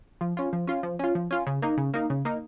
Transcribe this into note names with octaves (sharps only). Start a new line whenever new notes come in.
F3
C#4 F4
F3
C#4 F4
F3
C#4 F4
F3
C#4 F4
C#3
A#3 D#4
C#3
A#3 D#4
C#3
A#3 D#4